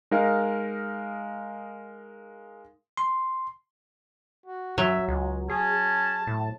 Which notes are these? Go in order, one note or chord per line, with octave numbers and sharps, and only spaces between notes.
G#3 D#4 A#4 F5
C6
F#4
F#2 F#3 E5
C#2 G#3
C#4 G#4 A5
A2